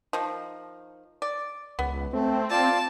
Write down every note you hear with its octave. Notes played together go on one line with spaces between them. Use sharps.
D#3 F3
D5
C#2 B3
A3 C4
F4 D5 A5